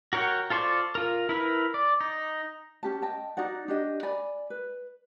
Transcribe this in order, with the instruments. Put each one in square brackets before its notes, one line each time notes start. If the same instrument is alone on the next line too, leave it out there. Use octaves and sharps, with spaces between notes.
[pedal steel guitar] F#4 A#4 C#5 F#5 G5
F4 A4 C5 D5 C#6
F4 A#4
E4 A#4 B4
D5
D#4
[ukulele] C#4 G4 A5
D#5 G5 A5
D#4 F#4 D5 F#5
D4 G4 D#5
D5 G#5 B5
B4